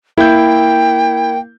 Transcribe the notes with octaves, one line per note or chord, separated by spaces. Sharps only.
A#3 E4 G5 G6